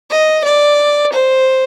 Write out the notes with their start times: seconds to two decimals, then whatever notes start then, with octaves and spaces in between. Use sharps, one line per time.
0.10 D#5
0.44 D5
1.13 C5